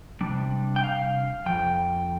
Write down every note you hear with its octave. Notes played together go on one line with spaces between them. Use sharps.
C3 G3 D4
G5
F5
F2 F3 G5